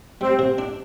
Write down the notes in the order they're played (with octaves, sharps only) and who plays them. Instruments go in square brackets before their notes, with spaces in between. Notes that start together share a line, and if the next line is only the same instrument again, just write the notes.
[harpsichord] G3 [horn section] C4
[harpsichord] C3
D4